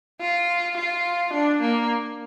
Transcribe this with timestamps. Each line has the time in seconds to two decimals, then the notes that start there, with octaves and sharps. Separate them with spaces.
0.21 F4
0.77 F4
1.33 D4
1.61 A#3